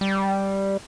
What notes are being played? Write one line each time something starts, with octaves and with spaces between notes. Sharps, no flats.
G3